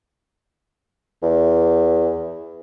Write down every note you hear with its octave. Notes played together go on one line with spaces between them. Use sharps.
E2